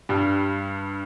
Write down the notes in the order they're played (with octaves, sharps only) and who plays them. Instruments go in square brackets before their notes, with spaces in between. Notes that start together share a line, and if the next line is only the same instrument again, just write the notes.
[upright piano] G2 G3